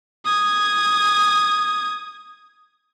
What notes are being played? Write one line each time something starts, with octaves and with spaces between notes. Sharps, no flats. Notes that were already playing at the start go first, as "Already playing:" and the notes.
D#6 G#6